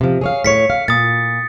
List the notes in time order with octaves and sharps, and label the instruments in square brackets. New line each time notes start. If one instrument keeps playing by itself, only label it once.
[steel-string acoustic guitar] C3 F3
G#4 C#5 F5
[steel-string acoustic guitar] A2 C#5 [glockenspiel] B6 C#7
[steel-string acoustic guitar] F5
[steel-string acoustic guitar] A#2 [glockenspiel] D#6 A6